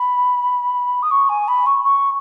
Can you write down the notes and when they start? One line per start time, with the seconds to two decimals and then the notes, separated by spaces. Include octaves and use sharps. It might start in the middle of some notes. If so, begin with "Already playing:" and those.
Already playing: B5
1.02 D#6
1.11 C#6
1.29 G#5
1.48 B5
1.66 C#6
1.84 C#6